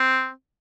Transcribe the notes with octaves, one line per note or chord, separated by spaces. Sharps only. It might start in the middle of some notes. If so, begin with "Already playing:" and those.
Already playing: C4